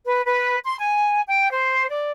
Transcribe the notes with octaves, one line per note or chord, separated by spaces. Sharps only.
B4
B4
C6
G#5
G5
C5
D5